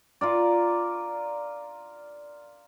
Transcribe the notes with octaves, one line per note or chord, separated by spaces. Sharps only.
F4 A#4 D5